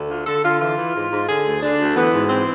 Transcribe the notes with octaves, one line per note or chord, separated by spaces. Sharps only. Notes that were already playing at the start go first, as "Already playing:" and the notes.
Already playing: D2
D3 F4
D3 A4
D3 F4
E3 F4
E3
G#2
G#2
D3 G#4
D2
D3 D4
D2
E3 B3
G#2
E3 C4